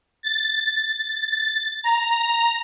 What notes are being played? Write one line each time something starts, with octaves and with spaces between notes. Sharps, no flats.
A6
A#5